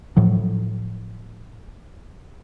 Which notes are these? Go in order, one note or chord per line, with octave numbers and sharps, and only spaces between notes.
A2 F3 F#3